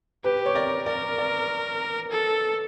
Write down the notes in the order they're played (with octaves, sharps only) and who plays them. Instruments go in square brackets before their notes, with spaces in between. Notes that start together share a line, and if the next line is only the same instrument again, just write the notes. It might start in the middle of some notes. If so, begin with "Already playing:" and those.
[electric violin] G4 [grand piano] B4
[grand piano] C#5
[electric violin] A#4 [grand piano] D5
[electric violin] A#4 [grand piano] D5
[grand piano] D5
[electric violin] A4